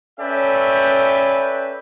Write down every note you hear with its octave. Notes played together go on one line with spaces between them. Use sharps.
C#4 A4 B4 D5 E5 G5